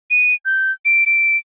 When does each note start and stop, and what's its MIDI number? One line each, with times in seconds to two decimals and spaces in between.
0.11 0.34 99
0.46 0.72 91
0.86 1.04 98
1.06 1.37 98